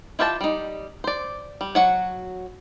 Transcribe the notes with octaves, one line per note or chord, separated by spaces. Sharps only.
E4 F4 G4 E5 A5
G3 D#4
C5 D5
G3
F#3 F#4 F#5